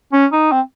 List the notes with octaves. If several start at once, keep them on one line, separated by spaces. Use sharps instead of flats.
C#4
D#4
C4